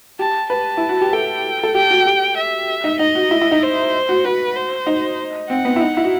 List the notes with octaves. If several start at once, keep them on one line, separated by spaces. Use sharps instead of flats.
G4 A5
B4 A5
E4
F#4
G4
A4 G5
A4
G4 G5
F#4
G4
E5
D#4
D#4 D#5
F#4
E4
E4
D#4
C5
F#4
F#4 B4
C5
D#4
C4 F#5
B3
E4
D#4
E4
F#4